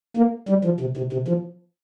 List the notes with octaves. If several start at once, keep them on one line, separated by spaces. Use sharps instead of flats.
A#3
G3
F3
C3
C3
C3
F3